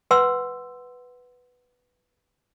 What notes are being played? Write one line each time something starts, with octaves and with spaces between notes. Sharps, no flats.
B4 F#5 C6 E6